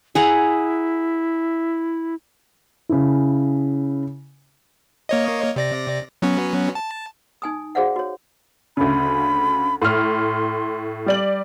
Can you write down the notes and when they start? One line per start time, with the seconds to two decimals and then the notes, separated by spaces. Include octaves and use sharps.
0.15 E4 G#4 F#5 A#5
2.89 C#3 E4
5.09 A#3 C#5 D#5
5.56 C3 D5 A#6
6.22 F#3 B3 C#4
6.75 A5
7.42 D#4 G#5 D#6
7.75 F#4 G#4 C5 D5 F5 F#5
7.96 F#4 C#5
8.77 D2 C#3 B5
9.82 A2 C6 F6
11.06 G3 D5 F#7